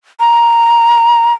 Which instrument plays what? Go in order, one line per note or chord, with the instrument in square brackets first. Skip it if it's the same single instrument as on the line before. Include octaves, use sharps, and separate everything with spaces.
[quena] A#5